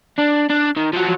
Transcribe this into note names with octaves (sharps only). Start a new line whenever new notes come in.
D4
D4
D#3
F3 F#3